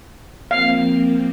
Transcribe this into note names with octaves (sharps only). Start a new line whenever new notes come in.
F3 A#3 C4 F5